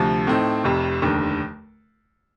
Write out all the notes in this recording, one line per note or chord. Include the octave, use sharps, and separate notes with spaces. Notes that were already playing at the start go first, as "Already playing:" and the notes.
Already playing: D2 C3 F3
A2 A3 C4 D#4
F1 F2 C3
F1 D#2 D3